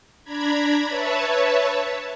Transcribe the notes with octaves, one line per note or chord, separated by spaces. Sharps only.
D4 A#5 B5 G#6
B4 C#5 E5 A5